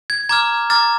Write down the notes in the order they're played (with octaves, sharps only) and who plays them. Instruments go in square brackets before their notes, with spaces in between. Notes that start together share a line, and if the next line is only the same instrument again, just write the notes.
[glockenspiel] G#6
A#5 D6 F6 G#6
A#5 D6 F6 A6